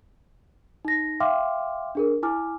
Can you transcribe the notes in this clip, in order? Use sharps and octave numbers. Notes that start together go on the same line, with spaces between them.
D#4 A#6
E5 F5 G5 C6 D6 F6
D4 G#4 A#4
E4 G#5 D6 F6